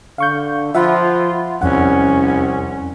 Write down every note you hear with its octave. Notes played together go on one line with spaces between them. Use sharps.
D3 F5 C#6 G6
F3 F4 E5 F#5 B5
C2 F2 C#4 F#5